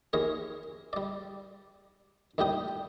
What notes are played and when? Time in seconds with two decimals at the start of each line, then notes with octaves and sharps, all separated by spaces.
0.13 D#2 G#4 A#4 C#5
0.93 G3 D5
2.38 D#2 A2 G3 G4 G5 D#6